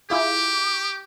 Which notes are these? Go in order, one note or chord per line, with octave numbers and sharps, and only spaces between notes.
E4 F4 G4 G#4 D6